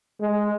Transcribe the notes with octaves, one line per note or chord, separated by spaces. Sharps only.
G#3